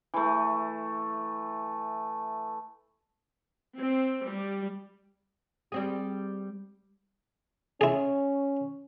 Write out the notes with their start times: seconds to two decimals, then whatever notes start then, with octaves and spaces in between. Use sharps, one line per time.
0.14 E3 A3
3.77 C4
4.25 G3
5.72 G3 C4 G#4
7.81 C#4 E4 G#4